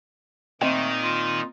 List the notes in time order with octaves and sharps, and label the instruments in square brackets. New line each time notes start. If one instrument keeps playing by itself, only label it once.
[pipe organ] A#2 D#4 [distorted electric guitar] D#3 [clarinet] A3 [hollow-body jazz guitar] C4 D#5 G5
[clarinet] F4